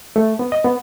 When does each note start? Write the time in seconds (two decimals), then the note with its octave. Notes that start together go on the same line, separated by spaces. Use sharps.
0.16 A3
0.39 B3
0.52 D#5
0.64 B3